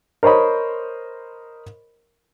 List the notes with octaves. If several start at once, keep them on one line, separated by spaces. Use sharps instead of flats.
A#4 C5 C#5 D#5 B5